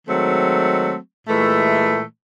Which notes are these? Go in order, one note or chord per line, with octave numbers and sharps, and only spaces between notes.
D#3 F#3 G#3 A3 C4
A#2 E3 G#3 A3